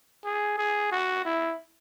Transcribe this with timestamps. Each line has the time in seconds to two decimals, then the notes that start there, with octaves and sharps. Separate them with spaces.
0.24 G#4
0.58 G#4
0.92 F#4
1.25 E4